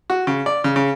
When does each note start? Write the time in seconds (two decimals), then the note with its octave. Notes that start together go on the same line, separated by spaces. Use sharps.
0.10 F#4
0.27 C#3
0.46 D5
0.64 C#3
0.76 C#3